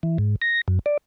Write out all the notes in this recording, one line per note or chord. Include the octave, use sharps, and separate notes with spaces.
E3
G#2
A#6
F#2
D5